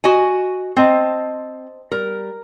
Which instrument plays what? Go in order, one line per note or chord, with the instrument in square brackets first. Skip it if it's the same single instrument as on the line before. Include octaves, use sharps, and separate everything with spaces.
[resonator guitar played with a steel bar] F#4 D#5 G#5
[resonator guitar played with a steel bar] C4 [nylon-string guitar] C5 D#5 A5
[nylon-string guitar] G3 [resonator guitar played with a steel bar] A#4